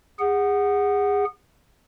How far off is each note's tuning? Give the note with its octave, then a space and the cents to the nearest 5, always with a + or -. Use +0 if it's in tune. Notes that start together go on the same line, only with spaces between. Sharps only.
G#4 -30 F#5 +0